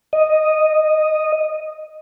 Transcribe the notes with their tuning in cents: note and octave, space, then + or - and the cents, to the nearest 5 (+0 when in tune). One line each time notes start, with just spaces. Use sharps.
D#5 -5